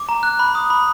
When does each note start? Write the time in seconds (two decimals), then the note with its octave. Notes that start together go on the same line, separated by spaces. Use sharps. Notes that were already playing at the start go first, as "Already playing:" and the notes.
Already playing: D6
0.09 A#5
0.23 F#6
0.39 B5
0.55 D#6
0.70 B5